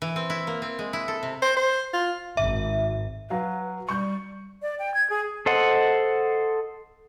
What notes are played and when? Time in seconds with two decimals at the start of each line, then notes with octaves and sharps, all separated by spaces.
0.02 E3
0.16 C4
0.30 E4
0.47 A#3
0.62 C4
0.79 G#3
0.93 E4
1.08 A4
1.23 C3
1.42 C5
1.57 C5
1.93 F4
2.37 G#1 E5
3.30 F#3 B4 F5
3.89 G3 C#6 G6
4.62 D5
4.79 G5
4.94 G#6
5.10 G#4
5.46 A4 C5 D#5 F#5